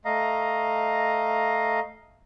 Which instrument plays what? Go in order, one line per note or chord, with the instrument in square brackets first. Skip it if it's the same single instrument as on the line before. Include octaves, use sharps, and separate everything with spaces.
[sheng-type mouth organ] A3 D#5 F5 A#5